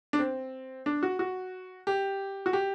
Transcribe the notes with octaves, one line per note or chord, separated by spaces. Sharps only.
D4
C4
D4
F#4
F#4
G4
F#4
G4